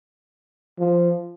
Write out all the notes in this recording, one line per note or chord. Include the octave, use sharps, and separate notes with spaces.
F3